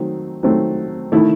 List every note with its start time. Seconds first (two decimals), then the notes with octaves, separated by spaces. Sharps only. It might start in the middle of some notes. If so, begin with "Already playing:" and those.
Already playing: D#3 F#3 A3 C4
0.43 D#3 F#3 A3 C4
1.12 D#3 A3 E4